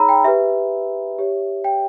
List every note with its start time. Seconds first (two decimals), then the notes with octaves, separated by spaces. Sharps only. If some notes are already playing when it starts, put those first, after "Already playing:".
Already playing: D#4 G#4 C#5 A#5 B5 E6
0.09 G5
0.24 G4 B4 E5
1.19 G4 C#5
1.64 G5